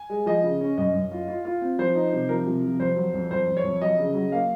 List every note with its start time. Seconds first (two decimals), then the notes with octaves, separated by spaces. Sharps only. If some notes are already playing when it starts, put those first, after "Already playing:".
Already playing: G#5
0.10 G#3
0.26 F3 D#5
0.43 C#3
0.61 C#4
0.77 F#2 D#5
0.95 F#2
1.12 F4
1.28 F4
1.45 F4
1.61 C4
1.78 F3 C5
1.95 D#4
2.13 C3
2.29 F3 A#4
2.46 C3
2.64 F3
2.80 F2 C5
2.96 F#3
3.14 F2
3.31 F2 C5
3.48 F2
3.57 C#5
3.64 F2
3.81 F#3 D#5
3.98 C#3
4.15 F#3
4.32 A#3 F5